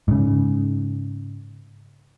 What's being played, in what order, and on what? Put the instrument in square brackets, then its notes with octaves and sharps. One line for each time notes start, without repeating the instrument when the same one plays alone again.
[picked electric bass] G#2 C#3